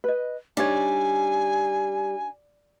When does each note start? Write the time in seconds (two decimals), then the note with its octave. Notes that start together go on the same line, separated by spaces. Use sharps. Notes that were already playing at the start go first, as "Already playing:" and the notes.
0.04 B4 D#5
0.57 G3 D4 D#4 C#5 G#5